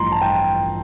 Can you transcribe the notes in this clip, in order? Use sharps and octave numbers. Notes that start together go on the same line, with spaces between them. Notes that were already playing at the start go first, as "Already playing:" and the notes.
Already playing: A1 G2 F3 A#5 C6
A5
G5